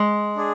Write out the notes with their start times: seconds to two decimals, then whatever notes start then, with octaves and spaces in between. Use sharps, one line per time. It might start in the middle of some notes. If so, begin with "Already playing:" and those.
Already playing: G#3
0.36 D4 G#4